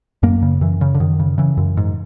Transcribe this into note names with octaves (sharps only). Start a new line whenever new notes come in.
F#2 A#3
C#3
F#2 E3
C#3
D3
F#2 D#3
C#3
C#3 E3
F#2
G#2